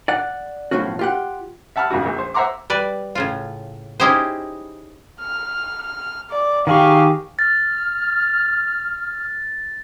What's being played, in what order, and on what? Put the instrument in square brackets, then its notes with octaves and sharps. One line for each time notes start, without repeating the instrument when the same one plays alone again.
[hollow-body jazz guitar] D5 F#5
B1 A2 C3 F3 C#4 F#4
F4 G4 F#5
[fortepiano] E5 F#5 A5 B5 F6
A#1 F2 C#3 F#4
A#1
C5
C5 E5 F#5 A#5 C6 D6
[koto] G3 B4 D5
A2 C#3 F4
C#4 D#4 E4 G4 G#4 C5
[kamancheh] F6
D5
[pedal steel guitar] D#3 G#4 C#6 [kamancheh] G4 F5
[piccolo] F6 [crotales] A6